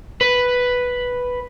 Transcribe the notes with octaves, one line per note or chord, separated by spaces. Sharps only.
B4